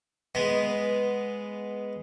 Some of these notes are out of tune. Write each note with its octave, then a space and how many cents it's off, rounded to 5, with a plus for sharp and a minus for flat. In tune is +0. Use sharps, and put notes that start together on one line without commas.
G#3 +0 B3 +0